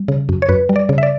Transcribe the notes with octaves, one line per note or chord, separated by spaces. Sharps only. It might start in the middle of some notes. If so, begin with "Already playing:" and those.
Already playing: G3
C#3
F#2
C#5
F#2 B4
G3
D5
C#3
E5
D5